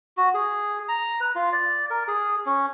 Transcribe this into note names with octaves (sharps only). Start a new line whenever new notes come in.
F#4
G#4
A#5
B4
F4
D5
A#4
G#4
C#4